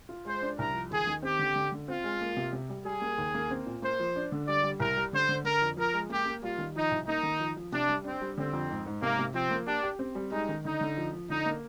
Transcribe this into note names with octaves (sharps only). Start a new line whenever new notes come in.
F4
G#3 C5
D4
C2 A#4
F3
D#2 G#4
D#3
C4 G4
D3
D3
D3
C4 F4
G#3
A#3
C3
C3
G3
G3 G#4
A#3
D#2
A#3
C4
A#2
A#3 C5
F3
D4
D3
G3 D5
G3
C2 A#4
G3
D3 C5
D3
D3 A#4
F2
F3 A#4
G#3
A#3 G4
A#3
G3 F4
D#3
F3 D#4
C2
A#3 D#4
D#3
F3
F3
C3 D4
G3
C4 D4
G3
D3 C4
F2
G#2
G#2
C3 A#3
C3
F3 C4
A#3
D4 G4
G4
C4
G3
G#3 D#4
D#3
D3 D#4
D3
F3
F3
D3 D#4
A#3